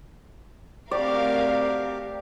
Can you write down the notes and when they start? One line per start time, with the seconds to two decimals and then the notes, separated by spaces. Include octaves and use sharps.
0.91 A3 C4 F#4 G4 A#4 D5 F5